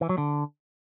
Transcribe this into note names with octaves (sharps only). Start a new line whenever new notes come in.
E3
F#3
D3